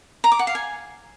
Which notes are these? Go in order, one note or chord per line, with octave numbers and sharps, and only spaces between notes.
A#5
D6
F#5
F5
G#5